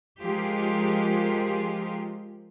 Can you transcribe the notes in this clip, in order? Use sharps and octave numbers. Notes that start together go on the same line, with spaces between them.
F3 G#3 F4 G4 G#4 A#4